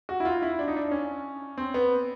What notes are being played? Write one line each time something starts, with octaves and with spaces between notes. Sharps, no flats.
F#4
E4
F4
E4
D4
D#4
D4
C#4
C4
B3